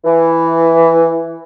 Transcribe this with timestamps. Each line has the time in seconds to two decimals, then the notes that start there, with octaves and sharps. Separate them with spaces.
0.05 E3